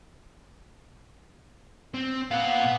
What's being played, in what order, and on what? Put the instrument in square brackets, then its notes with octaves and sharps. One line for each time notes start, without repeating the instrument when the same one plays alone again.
[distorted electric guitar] C4
[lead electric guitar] A#2 F5 [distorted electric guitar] B3 F#5